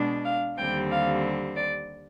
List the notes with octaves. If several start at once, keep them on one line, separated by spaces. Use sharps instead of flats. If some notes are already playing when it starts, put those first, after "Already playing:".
Already playing: B2 G#3 D4
F5
D#2 D3 G3 C4 G5
F5
D5